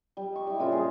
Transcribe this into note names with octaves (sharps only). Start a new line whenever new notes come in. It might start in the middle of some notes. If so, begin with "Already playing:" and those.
G3
D#5 C#6
G3 E4
A#2 C#3 F4 E5
G#4